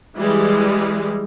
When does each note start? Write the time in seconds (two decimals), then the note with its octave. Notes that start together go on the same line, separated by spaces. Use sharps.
0.15 E3 G3 G#3